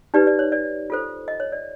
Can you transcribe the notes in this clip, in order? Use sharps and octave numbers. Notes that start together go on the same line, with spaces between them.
D#4 G4 B4 D5
D5
C#5
D5
F4 A4 C5
D#5
C#5
D5